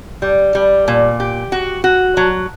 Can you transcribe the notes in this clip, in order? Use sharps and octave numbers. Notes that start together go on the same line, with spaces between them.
G3
G3
A#2
G4
F#4
F#4
F#3